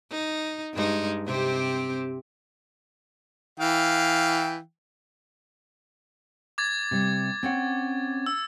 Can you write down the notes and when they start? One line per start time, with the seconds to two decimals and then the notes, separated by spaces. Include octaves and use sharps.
0.11 D#4
0.73 G2 G#3 D#4
1.27 C3 C4 G4
3.60 E3 F5 G5
6.58 D6 G#6 A6
6.91 C3 G3
7.43 C4 C#4 F#5
8.26 E6